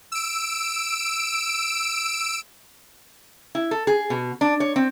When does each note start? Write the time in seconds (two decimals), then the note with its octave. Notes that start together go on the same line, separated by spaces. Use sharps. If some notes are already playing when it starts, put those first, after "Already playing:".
0.12 E6 D7
3.55 E4
3.71 A4
3.87 G#4
4.10 B2
4.41 D4
4.60 C#5
4.76 C4